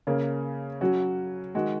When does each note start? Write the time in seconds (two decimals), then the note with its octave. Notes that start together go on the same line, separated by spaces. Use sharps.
0.07 C#3 A#3 C#4
0.81 F#3 C#4 F#4
1.55 D#3 G#3 F#4